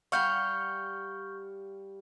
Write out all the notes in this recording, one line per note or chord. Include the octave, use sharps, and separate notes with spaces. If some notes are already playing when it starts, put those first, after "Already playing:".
G3 F5 F#5 C#6 F6 G6